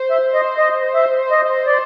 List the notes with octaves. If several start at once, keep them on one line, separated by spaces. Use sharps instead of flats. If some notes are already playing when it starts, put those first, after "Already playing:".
Already playing: C5
E5
D#5
D#5
E5
D#5
D5